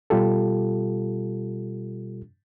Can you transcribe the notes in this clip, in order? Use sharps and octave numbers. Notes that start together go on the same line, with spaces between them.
B2 G3 F4 G4 A4